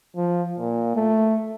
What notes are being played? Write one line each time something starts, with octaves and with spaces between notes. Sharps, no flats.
F3
A#2
A3